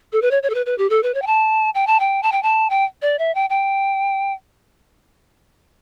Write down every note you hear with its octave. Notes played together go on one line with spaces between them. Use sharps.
A4
B4
C#5
C#5
A4
B4
B4
G4
A4
B4
C#5
G5
A5
G5
A5
G5
A5
G5
A5
G5
D5
E5
G5
G5